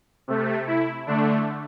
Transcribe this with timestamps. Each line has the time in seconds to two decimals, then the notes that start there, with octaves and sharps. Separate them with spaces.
0.28 C3 A3
0.67 E4
1.07 D3 A3 D4